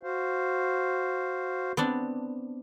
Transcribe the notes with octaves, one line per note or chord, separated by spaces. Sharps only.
F#4 C5 F5
B3 C4 D4